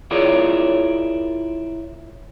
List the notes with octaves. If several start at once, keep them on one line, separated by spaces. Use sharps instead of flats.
E4 F4 G#4 A#4 C#5 D5